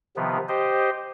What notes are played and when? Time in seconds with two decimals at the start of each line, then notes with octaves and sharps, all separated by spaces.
0.16 C3 D#3 F3 B3
0.48 G4 C5 D#5